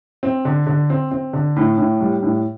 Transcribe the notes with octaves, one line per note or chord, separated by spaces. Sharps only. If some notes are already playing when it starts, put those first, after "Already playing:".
C4
D3
D3
C4
C4
D3
A2
A2
G3
A2